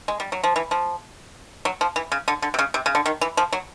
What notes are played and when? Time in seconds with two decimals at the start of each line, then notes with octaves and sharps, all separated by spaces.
0.08 G#3
0.20 G3
0.32 F#3
0.43 F3
0.56 E3
0.71 F3
1.65 F#3
1.81 F3
1.96 E3
2.12 C#3
2.28 D3
2.42 D3
2.54 C3
2.59 C#3
2.74 C3
2.86 C#3
2.95 D3
3.06 D#3
3.21 E3
3.37 F3
3.53 F#3